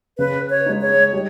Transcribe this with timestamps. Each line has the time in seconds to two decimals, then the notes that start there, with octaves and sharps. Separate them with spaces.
0.18 C#3 B4
0.50 C#5
0.66 G#3 D#4
0.81 C#5
1.13 G3